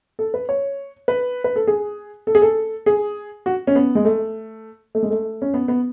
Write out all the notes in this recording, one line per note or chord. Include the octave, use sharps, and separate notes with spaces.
A4
B4
C#5
B4
B4
A4
G#4
A4
G#4
A4
G#4
F#4
C#4
B3
G#3
A3
A3
G#3
A3
C#4
B3
B3